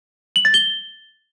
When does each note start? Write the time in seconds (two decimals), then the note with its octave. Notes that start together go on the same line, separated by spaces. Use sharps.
0.36 F#7
0.45 A6
0.54 G7